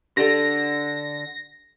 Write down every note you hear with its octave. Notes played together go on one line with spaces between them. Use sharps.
D3 D4 G4 A4 A#6